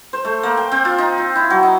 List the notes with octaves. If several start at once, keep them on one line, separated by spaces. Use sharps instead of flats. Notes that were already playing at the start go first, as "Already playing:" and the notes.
C5
A3
A#3
G5
C4
F4
D#4
F4
E4
F#3
D#4